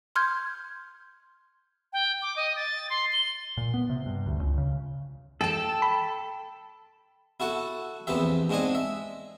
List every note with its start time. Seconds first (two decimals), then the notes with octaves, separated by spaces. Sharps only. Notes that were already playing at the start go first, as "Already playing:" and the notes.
0.16 C6 F6 G6 G#6
1.93 G5
2.22 D6
2.36 D#5
2.56 A6
2.90 C6
3.12 G7
3.57 A#2
3.74 B3
3.90 C3
4.06 G2
4.26 D2
4.40 C#2
4.58 C#3
5.41 A4 G5 A5
5.82 B5
7.40 E4 F#4 A4 F#5
8.07 A#1 E2 B3 C4 G4 E5
8.50 G#2 G#3 C4 D4 D#5 G#5
8.75 E5